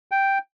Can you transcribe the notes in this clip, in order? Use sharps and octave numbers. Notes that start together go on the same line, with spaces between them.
G5